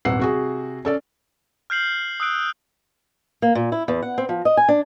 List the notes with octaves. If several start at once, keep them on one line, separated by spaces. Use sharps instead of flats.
D#1 G#1 B3 F#5 E6 C7
C3 F#4 G#4
C#4 A4 D5
F6 G6 C7 F#7
D#6 E6 F#6 D7
A#3
A#2
E4
E2
F#5
C4
F3
D#5
G#5
D4